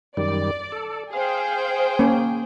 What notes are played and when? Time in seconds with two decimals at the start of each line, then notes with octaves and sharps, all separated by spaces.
0.17 F#2 D#3 G3 D5
0.72 A4
1.13 G#4 C5 F5 G5
1.99 A#3 C#4